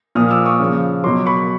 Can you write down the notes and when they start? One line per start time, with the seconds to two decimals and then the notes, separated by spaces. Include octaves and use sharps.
0.15 A#2 F3 D#6 F6
0.31 D6 E6
0.45 C#6 D#6
0.60 C#3 F3
1.04 B2 F#3 C6 D6
1.26 B5 C#6